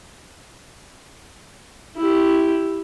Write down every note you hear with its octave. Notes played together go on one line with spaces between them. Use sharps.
E4 G4